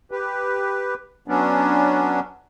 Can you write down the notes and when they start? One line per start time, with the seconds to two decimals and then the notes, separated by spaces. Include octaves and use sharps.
0.11 G4 B4
1.28 F#3 B3 C#4 D4